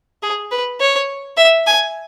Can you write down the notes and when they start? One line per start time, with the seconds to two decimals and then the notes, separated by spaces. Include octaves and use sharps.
0.23 G#4
0.51 B4
0.80 C#5
1.38 E5
1.67 G#5